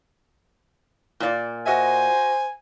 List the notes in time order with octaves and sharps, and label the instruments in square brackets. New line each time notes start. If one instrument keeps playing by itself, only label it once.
[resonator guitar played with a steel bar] A#2 D5
[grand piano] F#4 D#5 E5 [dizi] C5 [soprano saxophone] G#5